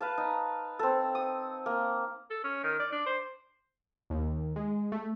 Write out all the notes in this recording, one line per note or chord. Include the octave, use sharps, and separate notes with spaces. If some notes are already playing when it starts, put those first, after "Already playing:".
B4 F5 A5
D#4
C4 A4
D#6
A#3
A4
C#4
D#3
D5
D4
C5
D#2
G#3
A3